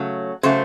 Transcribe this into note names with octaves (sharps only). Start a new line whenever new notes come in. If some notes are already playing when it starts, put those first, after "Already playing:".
Already playing: C#3 F#3 A3
C#3 F#3 A3 C5